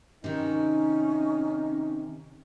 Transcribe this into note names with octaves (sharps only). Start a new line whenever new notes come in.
C3 D#3 C#4 D#4